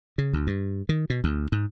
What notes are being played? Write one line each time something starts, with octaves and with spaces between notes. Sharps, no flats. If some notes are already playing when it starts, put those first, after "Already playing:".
C#3
D2
G2
D#3
B2
D2
G#2